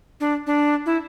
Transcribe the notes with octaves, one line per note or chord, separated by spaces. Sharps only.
D4
D4
E4